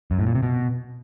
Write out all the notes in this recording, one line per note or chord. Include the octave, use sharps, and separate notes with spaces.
F#2
A2
A#2
C3
B2